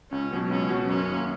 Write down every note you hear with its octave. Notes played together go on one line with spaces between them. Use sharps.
C#2 C#4
B2 F#3 B3 F#4
C#2 C#4
B2 F#3 B3 F#4
F#2 C#4
D#3 A#3